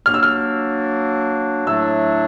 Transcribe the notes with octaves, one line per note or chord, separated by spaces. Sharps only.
F#3 A#3 D4 F6
E6
F6
A2 F#3 A3 D4 E6